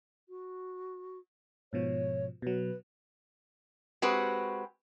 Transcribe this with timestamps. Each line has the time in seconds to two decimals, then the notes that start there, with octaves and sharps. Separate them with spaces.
0.29 F#4
1.73 G#2 B2 F3 C#5
2.42 B2 F#3 B4
4.02 G#3 C4 F#4 G4 B4